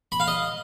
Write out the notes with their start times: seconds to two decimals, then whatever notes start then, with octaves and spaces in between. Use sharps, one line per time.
0.12 B5
0.20 F5
0.28 D#5